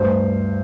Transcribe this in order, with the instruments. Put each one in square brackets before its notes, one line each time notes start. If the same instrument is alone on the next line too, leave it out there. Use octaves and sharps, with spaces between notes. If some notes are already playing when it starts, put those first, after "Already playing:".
Already playing: [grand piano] D2 G2 C5